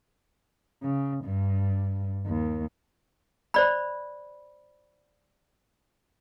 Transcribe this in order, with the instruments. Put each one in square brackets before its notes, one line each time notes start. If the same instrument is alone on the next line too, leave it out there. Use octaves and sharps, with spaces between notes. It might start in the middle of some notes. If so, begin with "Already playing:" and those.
[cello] C#3
G2
D#2
[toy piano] C5 D5 B5